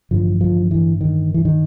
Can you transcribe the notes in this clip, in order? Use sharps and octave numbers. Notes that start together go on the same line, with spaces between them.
A1 G2 D3 F3
F3
E3
D#3
E3
D#3